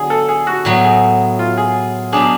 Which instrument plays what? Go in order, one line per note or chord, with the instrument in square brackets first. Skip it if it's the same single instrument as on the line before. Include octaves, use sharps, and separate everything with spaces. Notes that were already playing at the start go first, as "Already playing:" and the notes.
Already playing: [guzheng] D3 F#3 B3 [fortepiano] G#4
[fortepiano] A4
G#4
F#4
[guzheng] A2 F#3 B3
[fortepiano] G#4
F4
G#4
[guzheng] B2 F#3 B3 D4 [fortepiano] G#4